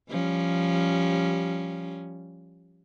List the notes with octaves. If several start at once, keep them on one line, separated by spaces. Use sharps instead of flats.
F3 G3 C#4